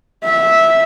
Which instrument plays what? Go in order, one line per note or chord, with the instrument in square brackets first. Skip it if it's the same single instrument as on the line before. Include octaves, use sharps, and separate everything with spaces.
[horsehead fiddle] E5